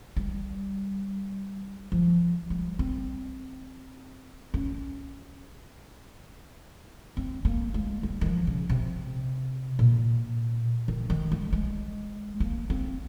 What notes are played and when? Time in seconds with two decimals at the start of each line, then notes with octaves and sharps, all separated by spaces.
0.17 G3
1.92 F3
2.50 G3
2.79 C4
4.54 C#4
7.17 C4
7.45 A#3
7.74 G#3
8.03 G3
8.21 D#3
8.26 F3
8.47 C#3
8.69 C3
9.79 A#2
10.88 D#3
11.10 D#3
11.32 G3
11.53 G#3
12.40 A#3
12.70 C4